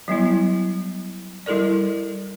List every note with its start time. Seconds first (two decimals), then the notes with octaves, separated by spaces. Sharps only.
0.08 F#3 G3 B3 E4
1.46 G3 E4 A4 A#4 D5